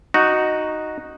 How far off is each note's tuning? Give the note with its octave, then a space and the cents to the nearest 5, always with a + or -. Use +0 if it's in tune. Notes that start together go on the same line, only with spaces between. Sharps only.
D#4 -5 F#4 +0